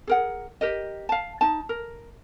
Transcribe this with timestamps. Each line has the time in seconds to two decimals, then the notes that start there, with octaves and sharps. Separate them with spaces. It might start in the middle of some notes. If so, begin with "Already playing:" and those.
0.07 G#4 A#4 F#5
0.61 G4 A#4 D#5
1.09 F5 A5
1.41 D#4 A5
1.69 A#4